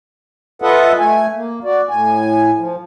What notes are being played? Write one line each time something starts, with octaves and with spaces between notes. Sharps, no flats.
F4 A4 B4 D#5 E5 F#5
A3 G#5
A#3
F#4 D5
A2 G#5
F3